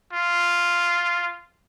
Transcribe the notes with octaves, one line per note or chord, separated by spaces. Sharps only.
F4